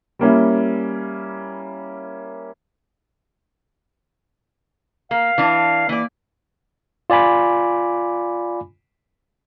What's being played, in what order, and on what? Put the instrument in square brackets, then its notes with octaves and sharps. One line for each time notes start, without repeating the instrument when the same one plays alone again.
[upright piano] G3 A#3 C#4 E4
[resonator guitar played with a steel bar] A#3 [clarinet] F5
[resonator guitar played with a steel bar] E3 D4
[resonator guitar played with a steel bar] E3 D5 [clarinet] A#3
[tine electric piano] F4 D5 G#5 B5 D6